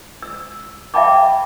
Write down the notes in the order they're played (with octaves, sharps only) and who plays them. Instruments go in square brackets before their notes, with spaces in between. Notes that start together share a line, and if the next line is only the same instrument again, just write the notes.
[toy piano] E6
E5 F5 G5 A5 B5 D6